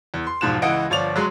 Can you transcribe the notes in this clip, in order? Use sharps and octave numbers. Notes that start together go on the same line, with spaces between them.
E2
C6
E1 G#2 F3 F#6 E7
C#2 E3 D#5 F#5 D7
G1 F3 C#5 D5 F7
F#3 G#3 C6